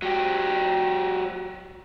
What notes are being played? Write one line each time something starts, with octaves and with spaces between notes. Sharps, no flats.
F#3 G4